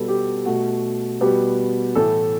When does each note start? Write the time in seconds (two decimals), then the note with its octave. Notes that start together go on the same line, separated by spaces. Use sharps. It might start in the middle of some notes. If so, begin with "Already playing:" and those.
Already playing: B2 G3 B3 A4
0.08 G4
0.46 B2 A3 F#4
1.21 B2 G3 B3 G4
1.95 A2 E3 A3 A4